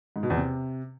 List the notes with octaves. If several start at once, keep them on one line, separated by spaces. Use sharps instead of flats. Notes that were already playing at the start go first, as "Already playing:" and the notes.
G#2
B2
E2
C3